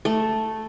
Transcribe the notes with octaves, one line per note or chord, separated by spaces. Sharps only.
A3